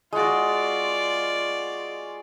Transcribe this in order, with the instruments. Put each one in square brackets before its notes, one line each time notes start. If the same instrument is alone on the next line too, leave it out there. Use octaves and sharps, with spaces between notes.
[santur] G#3 F#4 [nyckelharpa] F4 D5